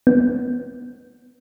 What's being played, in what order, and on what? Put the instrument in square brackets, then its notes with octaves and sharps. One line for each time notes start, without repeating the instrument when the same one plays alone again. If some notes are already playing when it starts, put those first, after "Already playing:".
[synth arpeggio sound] B3